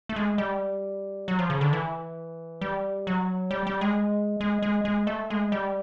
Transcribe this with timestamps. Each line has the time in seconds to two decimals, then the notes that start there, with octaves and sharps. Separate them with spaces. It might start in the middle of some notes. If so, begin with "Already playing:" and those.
0.09 A3
0.16 G#3
0.38 G3
1.28 F#3
1.39 F3
1.50 C#3
1.61 D3
1.73 E3
2.61 G3
3.07 F#3
3.51 G3
3.67 G3
3.81 G#3
4.41 G#3
4.62 G#3
4.85 G#3
5.07 A3
5.30 G#3
5.52 G3